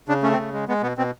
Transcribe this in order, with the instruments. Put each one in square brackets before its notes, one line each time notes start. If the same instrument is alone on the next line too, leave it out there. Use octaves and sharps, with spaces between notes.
[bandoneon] C#3 D4
A3 C#4
C4
C#3
G#3
G#3 B3
B2 B3
B2 C4